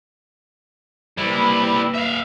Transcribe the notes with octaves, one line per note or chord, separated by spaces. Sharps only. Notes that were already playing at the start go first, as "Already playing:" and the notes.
G3 A#3 E4 B4 B5
E5 F5